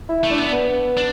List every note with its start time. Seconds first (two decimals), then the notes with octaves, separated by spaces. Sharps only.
0.08 E4
0.23 A3
0.30 D4
0.38 B3
0.53 B3
0.97 D4